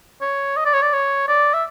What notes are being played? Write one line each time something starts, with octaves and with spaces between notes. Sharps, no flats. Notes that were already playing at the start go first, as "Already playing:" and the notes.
C#5
D#5
D5
C#5
D5
C#5
D5
E5